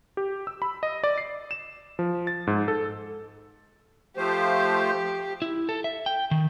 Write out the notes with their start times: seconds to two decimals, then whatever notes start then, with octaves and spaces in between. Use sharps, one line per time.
0.17 G4
0.47 E6
0.62 B5
0.83 D#5
1.04 D5
1.18 C7
1.51 E7
1.99 F3
2.27 A6
2.47 G#2
2.68 A4
4.17 F3 A3 G4 C5
5.42 E4
5.69 A4
5.84 E5
6.06 G5
6.31 D#3